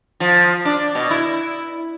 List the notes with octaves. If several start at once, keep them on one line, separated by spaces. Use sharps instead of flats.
F3
D4
B2
E4